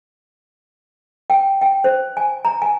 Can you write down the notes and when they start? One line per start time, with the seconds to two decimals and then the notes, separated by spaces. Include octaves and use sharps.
1.30 G5
1.61 G5
1.84 C5
2.17 G#5
2.45 A#5
2.62 G#5